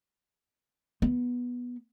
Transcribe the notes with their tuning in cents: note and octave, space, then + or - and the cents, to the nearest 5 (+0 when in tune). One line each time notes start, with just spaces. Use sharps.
B3 -10